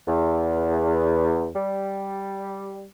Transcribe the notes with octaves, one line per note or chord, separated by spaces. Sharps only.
E2
G3